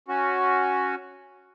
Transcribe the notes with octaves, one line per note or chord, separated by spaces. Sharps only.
C#4 F#4